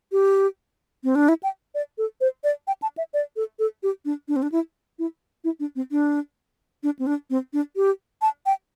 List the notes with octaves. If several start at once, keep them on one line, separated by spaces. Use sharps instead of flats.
G4
C4
D4
E4
G5
D5
A4
C5
D5
G5
A5
E5
D5
A4
A4
G4
D4
D4
C4
D4
E4
E4
E4
D4
C4
D4
D4
C4
D4
C4
D4
G4
A5
G5